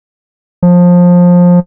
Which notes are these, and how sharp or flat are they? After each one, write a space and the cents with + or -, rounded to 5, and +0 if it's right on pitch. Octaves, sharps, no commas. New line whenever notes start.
F3 +20